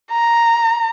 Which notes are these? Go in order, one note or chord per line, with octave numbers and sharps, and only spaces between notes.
A#5